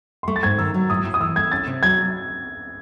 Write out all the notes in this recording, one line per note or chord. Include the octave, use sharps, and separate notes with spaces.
C6
A3 C#6
A6
G#2 G#6
D#3 E6
F#3
A2 D#6
A2
D#6
E3 E6
A3 G#6
C#4 A6
C3
F#3 G#6